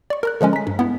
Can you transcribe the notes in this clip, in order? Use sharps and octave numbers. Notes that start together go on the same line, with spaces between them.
D5 C#6
A#4 A#5 F#6
D3 F3 G#3 C#4
A#5 B6
G2
B3 E4